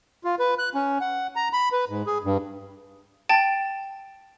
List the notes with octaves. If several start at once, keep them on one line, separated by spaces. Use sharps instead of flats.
F4
B4
F#6
C#4
F#5
A#5
B5
B4
G#2
G#4
G2
G5 A5 A6 D7